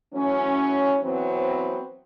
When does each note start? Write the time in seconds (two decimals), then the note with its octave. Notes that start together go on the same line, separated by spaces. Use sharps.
0.14 E3 F#3 A3 C#4
1.03 E3 F#3 B3 C4